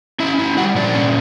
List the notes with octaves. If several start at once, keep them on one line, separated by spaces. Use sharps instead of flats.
C#4 E4 E5
E4
G3 F#4 F#5
A#2 D4 D5
C#4